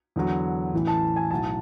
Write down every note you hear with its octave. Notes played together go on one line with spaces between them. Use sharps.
E2 D3 F#3
A1 A2 E3
A5
G#5
B1 A2 F#3 A5